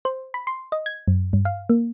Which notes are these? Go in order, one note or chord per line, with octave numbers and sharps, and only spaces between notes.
C5
B5
C6
D#5
G#6
F#2
G2
F5
A#3